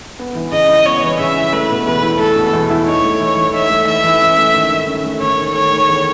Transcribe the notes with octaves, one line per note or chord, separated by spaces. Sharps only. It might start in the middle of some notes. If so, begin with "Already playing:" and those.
B3
E3
C#3 D#5
E4
B3 C#5
E3
C#3 E5
E4
A3 B4
B2
E2 B4
E4
A3 A4
B2
E2
E4
D#4 C#5
A3
E3
E3
D#4 E5
A3
E3 E5
E3
C#4
A3
D#3
D#3
C#4
A3
D#3 C#5
D#3
A3 C#5
D#3
E2